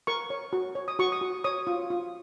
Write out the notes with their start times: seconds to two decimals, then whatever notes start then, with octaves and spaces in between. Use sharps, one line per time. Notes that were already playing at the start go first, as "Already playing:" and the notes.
0.07 A#4 C#6
0.30 C#5
0.53 F#4
0.75 C#5
0.88 D#6
0.99 F#4 C#6
1.12 D#6
1.21 F#4
1.44 C#5 D#6
1.67 F4
1.90 F4